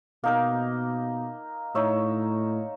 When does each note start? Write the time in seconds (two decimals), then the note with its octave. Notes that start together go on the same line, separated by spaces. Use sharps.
0.24 B2 A#3 D#4 A#4
1.75 A2 D#4 C#5 E5